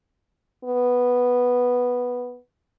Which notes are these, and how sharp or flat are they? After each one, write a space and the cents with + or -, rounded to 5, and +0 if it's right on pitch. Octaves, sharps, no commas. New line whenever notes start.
B3 -5